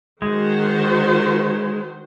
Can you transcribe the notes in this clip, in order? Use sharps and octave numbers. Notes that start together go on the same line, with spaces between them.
D#3 G#3 F#4 C5